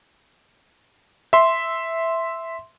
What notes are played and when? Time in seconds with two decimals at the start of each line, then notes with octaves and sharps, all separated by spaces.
1.33 E5 C6